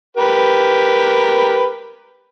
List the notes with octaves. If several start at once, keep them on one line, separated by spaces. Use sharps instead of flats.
G4 A#4 B4